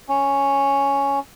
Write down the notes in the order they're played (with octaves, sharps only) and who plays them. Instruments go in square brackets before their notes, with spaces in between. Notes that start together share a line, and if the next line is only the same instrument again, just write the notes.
[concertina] C#4